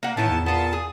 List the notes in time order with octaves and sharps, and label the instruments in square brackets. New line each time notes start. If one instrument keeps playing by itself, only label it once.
[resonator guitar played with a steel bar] A#3 F#5
[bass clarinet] A2 [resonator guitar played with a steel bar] D#3 E3 B3 [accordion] A5
[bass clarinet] E2
[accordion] A#2 A5 [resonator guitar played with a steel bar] B3 F4
[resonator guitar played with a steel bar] G#4